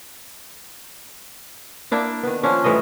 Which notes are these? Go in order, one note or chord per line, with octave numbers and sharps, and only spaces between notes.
A#3 D4 E4
D#3 B3
F3 A#3 C#4 D4
A2 E3 G3 D#5